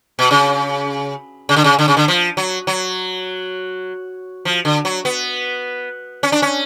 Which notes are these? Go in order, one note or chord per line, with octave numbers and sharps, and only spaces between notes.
B2
C#3
C#3
D3
C#3
D3
C#3
D3
F3
F#3
F#3
F3
D3
F#3
B3
C#4
D4
C#4